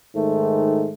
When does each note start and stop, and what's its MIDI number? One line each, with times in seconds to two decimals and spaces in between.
0.15 0.93 44
0.15 0.93 51
0.15 0.93 57